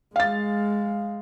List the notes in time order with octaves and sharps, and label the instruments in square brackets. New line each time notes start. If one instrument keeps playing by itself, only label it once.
[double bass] G#3 [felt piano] F5 A6